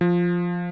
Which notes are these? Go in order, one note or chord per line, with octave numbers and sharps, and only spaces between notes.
F3